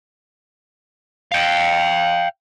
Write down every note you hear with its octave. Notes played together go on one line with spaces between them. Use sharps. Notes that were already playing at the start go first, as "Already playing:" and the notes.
F5 G5